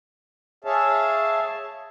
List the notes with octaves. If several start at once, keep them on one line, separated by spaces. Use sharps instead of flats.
G#4 C#5 E5 F5 A5